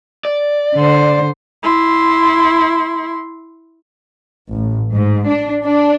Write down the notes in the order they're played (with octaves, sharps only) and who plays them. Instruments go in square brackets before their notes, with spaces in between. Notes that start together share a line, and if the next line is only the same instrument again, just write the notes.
[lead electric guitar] D5
[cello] D3 C5
[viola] E4 C6
[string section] A1
G#2
D4
D4